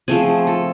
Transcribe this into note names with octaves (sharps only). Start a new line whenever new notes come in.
F3 A3 C4 G#4
A4